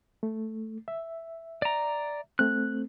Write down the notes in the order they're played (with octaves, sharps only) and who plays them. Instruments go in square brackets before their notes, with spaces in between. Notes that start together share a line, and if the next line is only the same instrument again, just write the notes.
[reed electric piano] A3
E5
[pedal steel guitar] D5 A#5
[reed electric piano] A3 C4 [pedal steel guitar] F#6